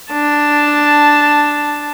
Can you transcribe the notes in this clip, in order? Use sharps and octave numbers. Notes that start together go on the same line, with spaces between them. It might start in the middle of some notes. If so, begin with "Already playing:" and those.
D4 A5